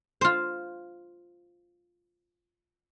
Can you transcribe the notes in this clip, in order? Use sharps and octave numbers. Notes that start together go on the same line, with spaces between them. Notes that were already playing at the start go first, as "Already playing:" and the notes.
F4 C5